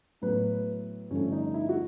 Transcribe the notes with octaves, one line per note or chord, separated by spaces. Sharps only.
A2 F#3 B3 B4
G2 D3 F3 A3 C#4
D#4
E4
F#4